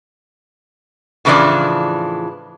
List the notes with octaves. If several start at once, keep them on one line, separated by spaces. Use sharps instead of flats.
A2 C#3 E3 F3 D4 D5